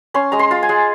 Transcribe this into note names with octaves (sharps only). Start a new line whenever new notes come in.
C#4 C6
G#3 A#5
C6
F4
G#5
G#3